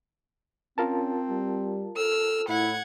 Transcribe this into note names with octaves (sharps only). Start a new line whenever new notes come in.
C4 C#4 F4 A#4 A5
G3
A4 E6 F6
A2 E4 F#5 G#6